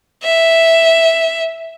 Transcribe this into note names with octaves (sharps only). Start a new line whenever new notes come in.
E5